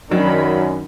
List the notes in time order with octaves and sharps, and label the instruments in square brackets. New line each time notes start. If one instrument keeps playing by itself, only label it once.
[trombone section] F#2 [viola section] D#3 B5 [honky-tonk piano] F#3 [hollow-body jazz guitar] D4